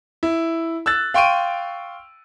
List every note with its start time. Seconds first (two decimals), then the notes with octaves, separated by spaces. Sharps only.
0.23 E4
0.86 E6 F#6 A6
1.14 F5 G5 C6 C#6 D7 D#7